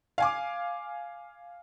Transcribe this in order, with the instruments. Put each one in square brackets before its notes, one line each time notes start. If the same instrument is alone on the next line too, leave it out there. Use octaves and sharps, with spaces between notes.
[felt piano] F5 G#5 D6